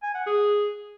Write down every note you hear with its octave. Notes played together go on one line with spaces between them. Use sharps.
G#5
F#5
G#4